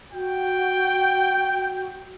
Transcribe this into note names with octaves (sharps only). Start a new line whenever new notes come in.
F#4 G5